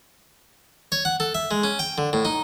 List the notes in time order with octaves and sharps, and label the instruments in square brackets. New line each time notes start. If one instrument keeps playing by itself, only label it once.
[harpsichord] C#5
F#5
A4
E5
G#3
C#4
G5
D3
A2
D#4